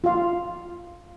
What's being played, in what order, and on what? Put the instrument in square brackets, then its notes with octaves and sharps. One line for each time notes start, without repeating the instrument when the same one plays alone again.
[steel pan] F4 F5